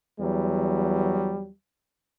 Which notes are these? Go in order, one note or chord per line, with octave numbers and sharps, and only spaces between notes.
E2 F#3 G3